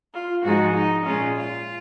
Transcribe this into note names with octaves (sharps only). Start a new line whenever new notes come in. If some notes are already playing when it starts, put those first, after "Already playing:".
F4
G#2 F3 G#3 D#4 F#4
D#4
A#2 G#3 C#4 F4
F4